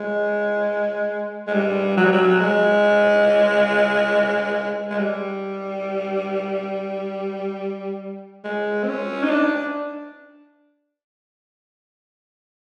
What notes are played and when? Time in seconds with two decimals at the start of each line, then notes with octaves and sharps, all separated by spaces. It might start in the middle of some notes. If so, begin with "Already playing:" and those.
Already playing: G#3
1.47 G#3
1.54 G3
1.97 F#3
2.05 G3
2.12 F#3
2.40 G#3
4.90 G#3
4.99 G3
8.44 G#3
8.83 C4
8.88 C#4
9.23 D#4
9.30 D4